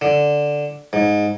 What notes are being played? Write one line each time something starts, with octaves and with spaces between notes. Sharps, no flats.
D3
G#2